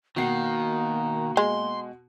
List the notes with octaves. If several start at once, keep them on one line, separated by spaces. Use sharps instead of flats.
B2 D#3 A#3 F#4 C7
G#3 C6